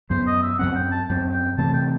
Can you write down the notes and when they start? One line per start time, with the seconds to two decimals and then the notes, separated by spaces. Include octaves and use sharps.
0.10 F#2 F#3 B3 C5
0.27 D#5
0.43 E5
0.59 F#2 F#3 C4 F#5
0.75 G5
0.92 A5
1.09 F#2 F#3 C4 G5
1.33 G5
1.58 C3 E3 A3 C4 A5
1.74 G5